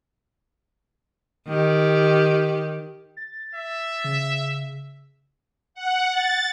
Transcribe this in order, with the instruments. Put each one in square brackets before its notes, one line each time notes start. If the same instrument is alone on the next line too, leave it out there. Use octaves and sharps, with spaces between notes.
[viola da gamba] D#3 G4
[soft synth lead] A6
[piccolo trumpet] E5
[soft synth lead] C#3
[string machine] F#5
A6